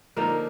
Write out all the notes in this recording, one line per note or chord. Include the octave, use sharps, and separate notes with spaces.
D3 F3 A#3 D#4 A#4